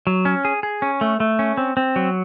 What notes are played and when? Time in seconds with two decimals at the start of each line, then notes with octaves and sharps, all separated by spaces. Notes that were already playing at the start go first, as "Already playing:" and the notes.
0.07 F#3
0.25 C#4
0.45 G#4
0.63 G#4
0.82 C#4
1.01 A3
1.20 A3
1.39 C#4
1.57 C4
1.77 C4
1.96 F#3